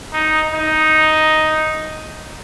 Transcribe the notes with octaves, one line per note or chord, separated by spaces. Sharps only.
D#4
D#4